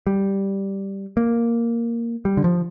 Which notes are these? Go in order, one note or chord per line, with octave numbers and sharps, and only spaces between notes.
G3
A#3
G3
D3
F3